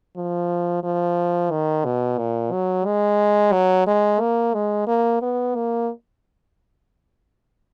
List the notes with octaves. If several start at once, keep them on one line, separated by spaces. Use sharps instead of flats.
F3
F3
D#3
B2
A#2
F#3
G#3
F#3
G#3
A#3
G#3
A#3
B3
A#3